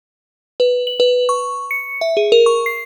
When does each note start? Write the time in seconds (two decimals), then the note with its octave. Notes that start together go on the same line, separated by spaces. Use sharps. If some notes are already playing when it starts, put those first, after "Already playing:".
0.60 B4
0.87 F#7
1.00 B4
1.29 C#6
1.71 C#7
2.01 E5
2.17 G#4
2.32 A#4
2.46 C#6
2.66 C7